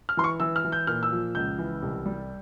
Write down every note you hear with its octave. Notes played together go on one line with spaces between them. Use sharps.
F6
E3 C6
C#6
E3 E6
F6
E3
G6
A#2 F6
E6
F3
C#2 G6
E3
C2
G3